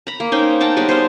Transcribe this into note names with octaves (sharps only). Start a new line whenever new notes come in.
A#5 B5
A#3
C#4 D#4 C5 G5
F#5 G5 A5 A#5
G3 G#3 B3 C#5
C5 C#5 D#5 F5